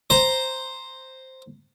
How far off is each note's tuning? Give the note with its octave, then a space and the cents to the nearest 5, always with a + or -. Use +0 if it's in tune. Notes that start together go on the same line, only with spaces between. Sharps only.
C5 +0 A#5 +0